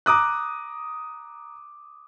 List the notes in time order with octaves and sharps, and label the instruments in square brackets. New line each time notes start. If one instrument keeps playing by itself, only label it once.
[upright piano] A#5 D6 D#6 F#6